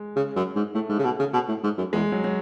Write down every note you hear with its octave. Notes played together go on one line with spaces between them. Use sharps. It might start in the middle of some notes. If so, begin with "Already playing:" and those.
Already playing: G#3
C#3
F#2
G#2
A2 A3
G#2
C#3
B2
C#3
B2
A2
G#2
F#2
E2 G#3
F#3
F#3